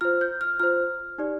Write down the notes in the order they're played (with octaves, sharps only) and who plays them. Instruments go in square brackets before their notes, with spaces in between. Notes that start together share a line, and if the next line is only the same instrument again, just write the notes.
[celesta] F4 C5 F6
G6
F6
F4 C5 F6
D#4 G4 D5